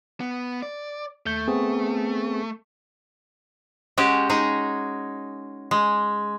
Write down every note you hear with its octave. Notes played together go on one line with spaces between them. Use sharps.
B3
D5
D#2 A3 G6
B3 C4 G#4
G#3 C#4 F#4 G4
G#3 D#4 G#4
G#3